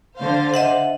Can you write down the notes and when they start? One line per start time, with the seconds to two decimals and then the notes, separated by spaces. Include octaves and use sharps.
0.17 D3 C5 F5
0.54 D#5 E5 F#5